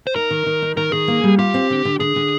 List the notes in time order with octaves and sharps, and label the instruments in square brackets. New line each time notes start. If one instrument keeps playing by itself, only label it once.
[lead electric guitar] C5
[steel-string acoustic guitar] D#4 [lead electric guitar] A#4
[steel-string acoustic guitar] D#3
D#3
D#4
[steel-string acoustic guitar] D#3 [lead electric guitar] A#4
[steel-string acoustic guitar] D#3 [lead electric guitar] G#4
[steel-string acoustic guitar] A#3
G3
[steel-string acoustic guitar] F4 [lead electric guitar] G4
[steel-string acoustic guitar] C4
D3
D3
[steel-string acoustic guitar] D3 [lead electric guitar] G#4
[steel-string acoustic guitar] D3